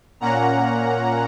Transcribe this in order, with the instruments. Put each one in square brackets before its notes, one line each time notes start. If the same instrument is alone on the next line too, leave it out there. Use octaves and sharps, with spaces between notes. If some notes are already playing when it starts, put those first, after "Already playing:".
[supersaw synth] A#2 A#3 C#4 F#5 A#5